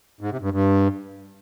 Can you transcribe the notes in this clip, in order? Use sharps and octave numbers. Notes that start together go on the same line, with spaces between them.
G#2
C3
G2
G2